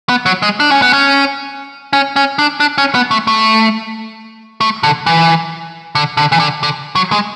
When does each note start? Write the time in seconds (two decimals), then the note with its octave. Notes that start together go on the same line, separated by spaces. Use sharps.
0.09 B3
0.26 F#3
0.42 G#3
0.60 D4
0.71 C#4
0.82 B3
0.93 C#4
1.93 C#4
2.16 C#4
2.39 D4
2.60 D4
2.78 C#4
2.95 B3
3.11 A3
3.27 A3
4.61 A3
4.83 D3
5.06 E3
5.95 D3
6.17 D3
6.32 E3
6.40 D3
6.63 D3
6.95 F#3
7.12 G#3